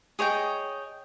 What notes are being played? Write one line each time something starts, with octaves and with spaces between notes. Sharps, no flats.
G#4 C#5 D#5 G5